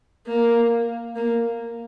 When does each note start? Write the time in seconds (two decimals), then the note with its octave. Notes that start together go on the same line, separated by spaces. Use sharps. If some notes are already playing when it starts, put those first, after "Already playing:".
0.26 A#3
1.15 A#3